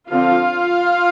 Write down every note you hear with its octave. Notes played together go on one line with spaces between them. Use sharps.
D3 F3 C4 F4 F5